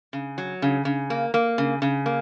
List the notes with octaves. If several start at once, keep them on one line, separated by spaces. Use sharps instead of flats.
C#3
F#3
C#3
C#3
A#3
A#3
C#3
C#3
A#3